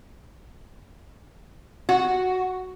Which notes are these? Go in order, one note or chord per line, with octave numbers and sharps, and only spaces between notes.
F#4